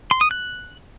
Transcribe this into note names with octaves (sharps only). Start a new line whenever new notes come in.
C6
D#6
F#6